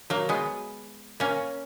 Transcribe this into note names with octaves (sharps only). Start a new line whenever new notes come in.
F#3 A#3
G#3 B3
A#3 C#4